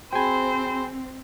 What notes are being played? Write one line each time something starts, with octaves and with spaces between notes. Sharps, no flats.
C4 F#4 G#4 C5 G5 G#5 B5